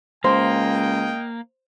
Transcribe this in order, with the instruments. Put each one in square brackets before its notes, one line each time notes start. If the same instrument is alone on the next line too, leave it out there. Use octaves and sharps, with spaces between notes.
[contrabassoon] C#2 [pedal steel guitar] A#3 [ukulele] C5 [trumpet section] D#5 G5